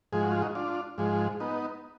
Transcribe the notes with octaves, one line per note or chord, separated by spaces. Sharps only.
G#2 F3 G#3 G#4
F#4
F4
D#4 F#4
D4 F4
G#2 F3 G#3
B3 D#4